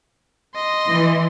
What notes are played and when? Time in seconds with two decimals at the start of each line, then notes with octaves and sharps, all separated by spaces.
0.55 D#5 C6
0.89 E3